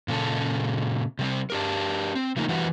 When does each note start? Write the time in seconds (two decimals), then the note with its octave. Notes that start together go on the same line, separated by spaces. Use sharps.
0.08 A#2 C#3 A4
1.19 C3 G3 C4
1.50 D4 G4 A#4
2.15 C4
2.36 C#3 F3 A3 A#3 D#4
2.49 E3 G3 F#4 B4